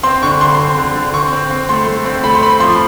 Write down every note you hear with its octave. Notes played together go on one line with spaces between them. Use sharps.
C4 C6
D3 C#6
D3 C6
C4
D3
D3
C4 C#6
C4
C4
A3 C6
A3
C4
A3 B5
C6
C4 B5
F3 C6